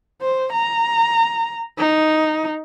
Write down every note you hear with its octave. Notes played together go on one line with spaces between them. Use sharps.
C5
A#5
D#4